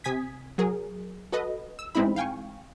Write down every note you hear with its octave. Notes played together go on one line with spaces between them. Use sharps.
C3 G#5 D#6 G#6 B6
F#3 G#4 A#4
F#4 A4 B4 D#5
E6
A1 G#3 C4 D#4 E4 B5
F5 G5 G#5 C#6